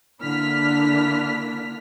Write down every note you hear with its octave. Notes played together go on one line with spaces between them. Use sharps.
D3 A#3 D4 E4 F6 B6